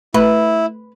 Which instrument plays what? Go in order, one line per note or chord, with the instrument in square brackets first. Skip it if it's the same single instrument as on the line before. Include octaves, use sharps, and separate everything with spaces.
[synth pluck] A3 [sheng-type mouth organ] E4 [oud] B4